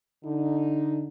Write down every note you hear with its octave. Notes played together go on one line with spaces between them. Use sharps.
D3 D#4